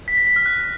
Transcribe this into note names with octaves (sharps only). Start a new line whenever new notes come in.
B6
A#6
B6
F6
F#6